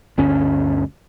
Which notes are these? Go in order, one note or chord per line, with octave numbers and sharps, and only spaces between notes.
G1 D2 C#4